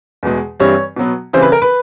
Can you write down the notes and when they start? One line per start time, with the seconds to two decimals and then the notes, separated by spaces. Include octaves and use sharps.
0.23 E2 B2 G#3
0.60 G2 E3 G3 C4 C#5
0.96 B2 F#3 B3
1.33 C#3 E3 G3 C4 C5
1.43 B4
1.52 A#4
1.62 B4